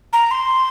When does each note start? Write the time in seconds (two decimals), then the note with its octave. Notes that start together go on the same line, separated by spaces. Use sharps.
0.13 A#5
0.31 C6